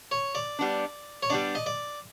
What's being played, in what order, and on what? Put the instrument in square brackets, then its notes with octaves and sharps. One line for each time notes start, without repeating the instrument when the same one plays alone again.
[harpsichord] C#5
D5
[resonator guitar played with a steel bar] G3 B3 D4
[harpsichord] C#5
[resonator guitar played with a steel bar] G3 B3 D4 [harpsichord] D5
[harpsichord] D#5
D5